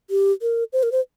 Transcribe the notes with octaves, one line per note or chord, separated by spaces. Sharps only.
G4
A#4
C5
A#4
C5